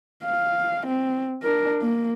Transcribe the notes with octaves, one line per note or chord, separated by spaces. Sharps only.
F5
C4
D4 A#4
A#3